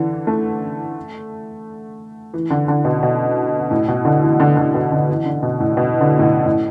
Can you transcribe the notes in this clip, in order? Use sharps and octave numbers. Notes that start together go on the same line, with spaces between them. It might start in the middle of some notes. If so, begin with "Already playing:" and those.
Already playing: D3 E3
A3
E3
D3
D3
B2
B2
A2
B2
D3
E3
D3
D3
B2
D3
E3
D3
B2
A2
B2
D3
A2
B2
A2